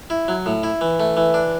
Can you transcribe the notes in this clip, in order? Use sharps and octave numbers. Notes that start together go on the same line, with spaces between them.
E4
F#3
A2
E4
E3
A3
E3
D4